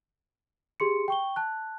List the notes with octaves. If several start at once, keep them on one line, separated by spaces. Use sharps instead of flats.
G4 G#4 C6 C#7
G5 C#6 G7
A5 F#6